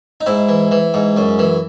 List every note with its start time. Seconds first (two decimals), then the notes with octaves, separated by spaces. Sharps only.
0.21 D#4
0.26 G#2 E4
0.49 E3
0.71 E3
0.94 G#2
1.17 F#2
1.39 E3